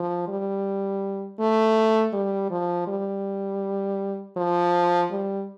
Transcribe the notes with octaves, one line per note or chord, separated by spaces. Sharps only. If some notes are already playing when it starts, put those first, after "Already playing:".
Already playing: F3
G3
A3
G3
F3
G3
F3
G3